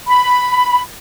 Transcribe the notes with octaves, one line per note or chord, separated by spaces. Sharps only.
B5